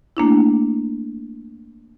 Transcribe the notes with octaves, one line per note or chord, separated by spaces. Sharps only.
A3 A#3 D4 E4